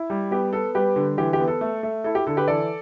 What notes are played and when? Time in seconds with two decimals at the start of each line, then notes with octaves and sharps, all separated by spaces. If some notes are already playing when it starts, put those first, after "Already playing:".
Already playing: E4
0.10 G3
0.31 B3 G4
0.53 B3 A4
0.75 G3 G4 B4
0.96 D3
1.18 E3 G4
1.33 G4
1.40 B3
1.48 A4
1.61 A3
1.83 A3
2.04 E4 A4
2.15 G4
2.27 D3 A4
2.37 G4 B4
2.48 E3 A4 D5